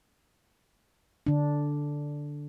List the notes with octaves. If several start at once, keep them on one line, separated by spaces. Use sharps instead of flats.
D3 D4